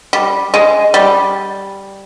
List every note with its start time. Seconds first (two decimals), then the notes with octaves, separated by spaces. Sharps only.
0.13 G3
0.54 G#3
0.94 G3